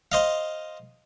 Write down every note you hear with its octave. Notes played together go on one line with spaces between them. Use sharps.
C5 D#5 F5